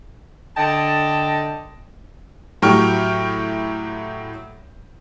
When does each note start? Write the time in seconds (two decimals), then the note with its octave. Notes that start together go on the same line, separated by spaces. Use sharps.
0.56 D3 D#5 G5 A5
2.62 A2 F#3 G4 G5 C#6 F6